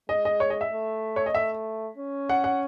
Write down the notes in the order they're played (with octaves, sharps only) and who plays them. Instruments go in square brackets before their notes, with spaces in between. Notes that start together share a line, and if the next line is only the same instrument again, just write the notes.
[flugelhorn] G#3 [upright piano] D#5
[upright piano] D#5
C#5
D#5
E5
[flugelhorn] A3
[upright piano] C#5
D#5
[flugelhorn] A3 [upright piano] E5
[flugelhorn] C#4
[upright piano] F#5
F#5